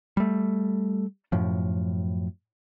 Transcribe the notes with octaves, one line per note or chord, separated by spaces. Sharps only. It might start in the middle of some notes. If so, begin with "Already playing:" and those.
G3 A3
F#2 A2 F3